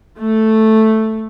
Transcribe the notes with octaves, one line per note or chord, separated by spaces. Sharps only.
A3